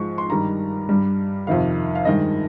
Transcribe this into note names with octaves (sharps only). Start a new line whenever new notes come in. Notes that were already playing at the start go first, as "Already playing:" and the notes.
Already playing: G#2 F3 G#3 C#6
C6
G2 D#3 G3 A#5
G2 G3
F2 C3 D#3 F5
F5
G2 D#3 G#3 D#5